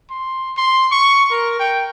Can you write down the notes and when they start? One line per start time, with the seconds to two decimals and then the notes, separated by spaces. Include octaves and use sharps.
0.10 C6
0.57 C6
0.92 C#6
1.31 A#4
1.60 G5